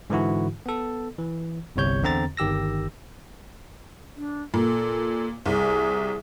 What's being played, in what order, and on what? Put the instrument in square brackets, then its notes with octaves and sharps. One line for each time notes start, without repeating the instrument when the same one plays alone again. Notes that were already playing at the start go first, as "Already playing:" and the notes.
[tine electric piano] G#2 D3 E3 E4 F#4
B3 A4
E3
G1 C2 C3 C#5 G6
E2 D3 C4 A#5 A6
G1 D#3 G4 E6 A#6
[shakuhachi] D4
[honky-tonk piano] A#2 [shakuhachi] A4
[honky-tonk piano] C2 [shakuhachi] G#4